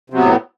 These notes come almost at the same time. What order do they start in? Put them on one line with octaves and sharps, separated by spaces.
C3 F#3 B3 A2